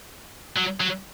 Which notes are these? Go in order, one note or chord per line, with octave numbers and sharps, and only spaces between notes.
F#3
F#3